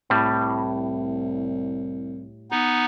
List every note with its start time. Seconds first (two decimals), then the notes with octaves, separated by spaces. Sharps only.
0.10 C2 A2 G3
2.51 B3 D#4